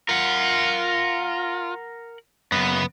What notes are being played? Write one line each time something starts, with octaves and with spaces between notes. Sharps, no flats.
F4 A#4 F#5
F#2 C#3 B3